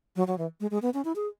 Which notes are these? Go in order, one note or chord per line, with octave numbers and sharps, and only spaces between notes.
F#3
F#3
E3
G#3
G#3
B3
C#4
E4
G#4